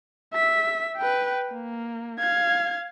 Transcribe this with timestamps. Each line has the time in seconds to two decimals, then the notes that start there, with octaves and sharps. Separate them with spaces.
0.33 E5 B6
0.97 B4 G5
1.53 A#3
2.19 F5 G#6